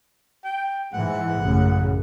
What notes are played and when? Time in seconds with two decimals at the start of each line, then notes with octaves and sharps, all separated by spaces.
0.44 G5
0.93 G#2 E3 G#3 F#5
1.39 A1 F#2 C#3